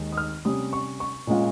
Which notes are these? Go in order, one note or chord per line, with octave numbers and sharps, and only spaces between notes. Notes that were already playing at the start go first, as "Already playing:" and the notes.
Already playing: D#2 D#3 G#3
D#6
F6
C3 G3 C#4 D#6
C#6
C#6
A#2 G#3 C#4 F4